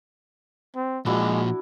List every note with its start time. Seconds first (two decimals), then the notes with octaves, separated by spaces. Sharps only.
0.76 C4
1.06 A#2 F3 G#3 D4 E4 F#4